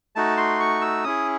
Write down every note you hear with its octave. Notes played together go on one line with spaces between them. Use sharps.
A3 D#4 F#4 A5
C6
C#6
E6
C#4 E4 G#4 D#6